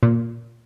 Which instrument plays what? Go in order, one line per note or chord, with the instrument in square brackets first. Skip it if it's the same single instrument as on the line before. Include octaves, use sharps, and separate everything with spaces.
[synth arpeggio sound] A#2